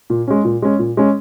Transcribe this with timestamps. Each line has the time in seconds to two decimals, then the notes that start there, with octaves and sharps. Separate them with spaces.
0.10 A#2
0.28 G#3 C#4
0.44 A#2
0.62 G#3 C#4
0.79 A#2
0.97 G#3 C#4